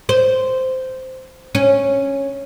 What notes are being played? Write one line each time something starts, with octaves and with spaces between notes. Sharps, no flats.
C5
C#4